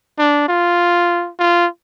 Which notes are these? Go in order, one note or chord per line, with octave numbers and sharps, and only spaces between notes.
D4
F4
F4